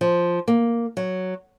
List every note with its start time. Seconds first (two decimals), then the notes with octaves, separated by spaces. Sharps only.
0.01 F3
0.48 A#3
0.97 F#3